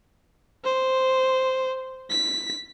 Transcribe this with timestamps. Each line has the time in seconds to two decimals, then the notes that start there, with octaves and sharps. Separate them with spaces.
0.65 C5
2.10 B6